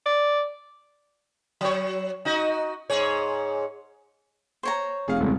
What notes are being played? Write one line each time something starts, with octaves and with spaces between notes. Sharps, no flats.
D5
F#3 C#5
D#4 F#4 D#5
G#2 G#4 C#5
C5 C#5 A#5
F1 G#4 F5
D#1 C2 D#3 G#3 A3